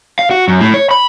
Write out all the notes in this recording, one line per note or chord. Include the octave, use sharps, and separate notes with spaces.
F5
F#4
F#2
A2
C#5
B5